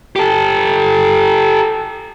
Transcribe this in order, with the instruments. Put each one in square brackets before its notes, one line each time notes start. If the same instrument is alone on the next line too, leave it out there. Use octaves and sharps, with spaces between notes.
[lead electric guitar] G4 A4